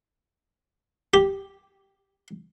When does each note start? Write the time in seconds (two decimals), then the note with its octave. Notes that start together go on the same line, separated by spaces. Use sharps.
1.14 G4